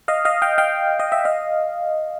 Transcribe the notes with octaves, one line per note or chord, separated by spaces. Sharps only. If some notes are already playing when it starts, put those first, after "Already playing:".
D#5 F5
D#5 F5
F5 G5
F5 G5
D#5
E5
D#5 F5